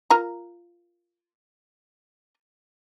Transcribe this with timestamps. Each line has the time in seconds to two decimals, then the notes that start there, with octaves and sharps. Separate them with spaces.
0.10 F4 A#4 A#5